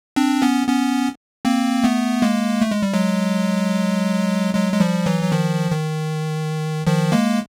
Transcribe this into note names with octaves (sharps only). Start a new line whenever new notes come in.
C4 D4
B3 C#4
B3 C#4
A#3 C4
A3 B3
G#3 A#3
A3
G#3
G3
F#3 G#3
F#3 G#3
G#3
F3 G3
E3 F#3
F#3
D#3 F3
D#3
D#3 F3
G#3 A#3